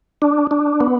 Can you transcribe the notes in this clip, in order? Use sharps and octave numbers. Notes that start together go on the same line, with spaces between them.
D4
D4
B3